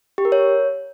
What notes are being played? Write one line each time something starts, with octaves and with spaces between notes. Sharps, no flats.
G4
A#4
C#5